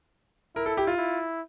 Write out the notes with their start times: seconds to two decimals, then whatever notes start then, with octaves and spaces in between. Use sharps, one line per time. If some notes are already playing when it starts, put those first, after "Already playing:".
0.55 E4 A#4
0.66 A4
0.77 G4
0.87 F4
0.97 E4